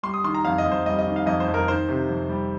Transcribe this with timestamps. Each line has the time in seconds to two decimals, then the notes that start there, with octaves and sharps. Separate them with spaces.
0.03 G3 C6
0.14 D#6
0.24 D#3 C6
0.35 A#5
0.45 F2 F5
0.58 D#5
0.66 F2
0.72 C5
0.86 G3 D#5
0.99 D#5
1.06 D#3
1.16 F5
1.26 F2 D#5
1.40 C5
1.48 F2
1.54 A#4
1.68 D#3 C5
1.89 C3
2.09 F2
2.29 G3